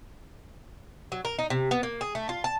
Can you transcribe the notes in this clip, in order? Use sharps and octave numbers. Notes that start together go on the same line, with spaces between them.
F#3
A#4
D#4
C3
B3
A#3
G#4
A3
F4
A5